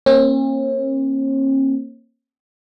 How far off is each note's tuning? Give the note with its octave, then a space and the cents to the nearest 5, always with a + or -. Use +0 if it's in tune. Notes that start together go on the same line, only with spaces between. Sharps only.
A#3 +0 C#4 -45